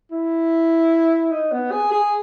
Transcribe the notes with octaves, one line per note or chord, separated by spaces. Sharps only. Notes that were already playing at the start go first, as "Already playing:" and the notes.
E4
D#4
B3
G#4
G#4